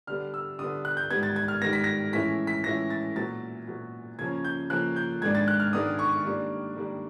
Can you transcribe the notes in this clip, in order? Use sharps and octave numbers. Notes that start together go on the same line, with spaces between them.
D3 G3 B3 F6
E6
D3 G3 B3 D#6
F#6
G6
G#2 D#3 G3 B3 G#6
A6
G#6
F6
G#2 D#3 G3 B3 A#6
B6
A#6
A2 E3 G#3 C#4 E4 B6
B6
A2 E3 G#3 C#4 E4 A#6
A6
A#2 F#3 B3 A6
A#2 F#3 B3
C#3 F3 A#3 C#4 G#6
G6
C#3 F3 A#3 C#4 F#6
G6
G#2 D#3 G#3 B3 D4 G#6
A6
F#6
F6
G#2 D#3 G#3 B3 D4 D#6
C#6
D#3 G3 A#3 D4
D#3 G3 A#3 D4